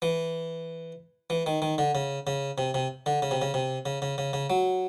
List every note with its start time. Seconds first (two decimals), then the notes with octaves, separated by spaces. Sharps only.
0.02 E3
1.30 E3
1.46 D#3
1.62 D#3
1.78 D3
1.95 C#3
2.27 C#3
2.58 C3
2.74 C3
3.06 D3
3.22 C#3
3.31 C3
3.42 C#3
3.54 C3
3.86 C#3
4.02 C#3
4.18 C#3
4.33 C#3
4.50 F#3